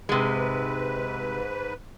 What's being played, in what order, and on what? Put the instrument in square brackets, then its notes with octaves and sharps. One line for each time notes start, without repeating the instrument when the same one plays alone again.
[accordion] G#2 B4 [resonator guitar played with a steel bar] C3 G#3